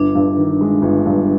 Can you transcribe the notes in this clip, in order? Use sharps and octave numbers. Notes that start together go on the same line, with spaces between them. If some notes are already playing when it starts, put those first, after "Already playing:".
Already playing: G1 D4
G2
D#3
G#3
G1
G2